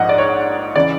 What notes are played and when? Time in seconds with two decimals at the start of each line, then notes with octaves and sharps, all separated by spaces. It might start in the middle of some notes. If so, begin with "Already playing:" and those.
Already playing: A#1 G#2 F3 D#5 F#5
0.09 D5
0.18 C#5
0.76 C#3 E3 D5